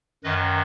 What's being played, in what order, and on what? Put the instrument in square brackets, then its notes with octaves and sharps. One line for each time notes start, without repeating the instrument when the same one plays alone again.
[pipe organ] F#2 D#3 B4 D#5